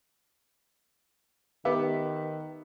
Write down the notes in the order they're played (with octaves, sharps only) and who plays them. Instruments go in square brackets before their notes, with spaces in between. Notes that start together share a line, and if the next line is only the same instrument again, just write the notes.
[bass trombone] D#3 [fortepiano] B3 G4 E5